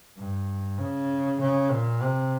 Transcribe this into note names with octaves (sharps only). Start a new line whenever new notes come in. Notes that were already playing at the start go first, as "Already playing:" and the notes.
G2
C#3
C#3
A#2
C3